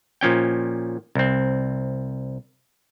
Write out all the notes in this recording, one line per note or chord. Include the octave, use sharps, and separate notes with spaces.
A#2 F3 C#4 G5
C2 C4